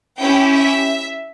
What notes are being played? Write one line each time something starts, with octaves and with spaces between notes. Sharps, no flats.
C#4 E4 G4 G5
E5